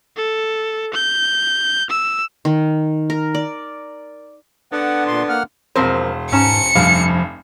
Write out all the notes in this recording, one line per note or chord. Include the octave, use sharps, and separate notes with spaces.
A4
G6
E6
D#3
A#4
D5
D3 B3 D4 F#5
A#2 C6
A#3 F#5 F6
E1 F3 C4 A#4 C5
G#2 C#4 A5 A#5 C#7
F1 G2 F3 F5